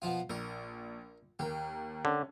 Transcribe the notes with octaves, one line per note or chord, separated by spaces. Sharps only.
B2 F3 F4
A#1 A#4
D#2 G4 A#4
D3 C#4